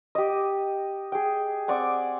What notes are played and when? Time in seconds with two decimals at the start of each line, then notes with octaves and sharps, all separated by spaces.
0.15 G4 D#5
1.12 G#4 G5
1.68 C4 D5 F#5 G#5